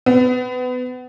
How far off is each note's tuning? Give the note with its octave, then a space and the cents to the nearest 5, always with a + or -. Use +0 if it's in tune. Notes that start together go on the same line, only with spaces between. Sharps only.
B3 +30